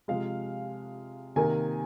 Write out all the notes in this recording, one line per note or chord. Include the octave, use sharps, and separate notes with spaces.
C3 F3 G#3 F5
C3 D#3 A#3 G#5